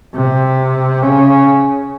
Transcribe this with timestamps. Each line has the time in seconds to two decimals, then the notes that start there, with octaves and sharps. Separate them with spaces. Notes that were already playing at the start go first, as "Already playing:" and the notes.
0.15 C3
1.02 C#3